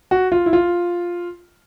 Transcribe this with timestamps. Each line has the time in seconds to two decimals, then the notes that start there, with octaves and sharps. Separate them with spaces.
0.11 F#4
0.32 F4
0.46 E4
0.53 F4